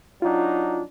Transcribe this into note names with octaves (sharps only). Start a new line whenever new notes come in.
F#3 D4 D#4 F4